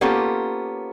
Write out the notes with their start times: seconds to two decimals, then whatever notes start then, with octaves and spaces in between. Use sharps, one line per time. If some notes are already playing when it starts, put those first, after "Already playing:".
0.01 A#3 B3 C#4 F4 G4 A4